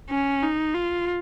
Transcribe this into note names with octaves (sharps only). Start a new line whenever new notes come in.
C#4
D#4
F4